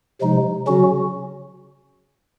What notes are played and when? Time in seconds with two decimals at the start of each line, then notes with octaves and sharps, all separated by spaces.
0.21 C3 F3 G#3 D#4
0.67 C#3 F#3 C#4 F#4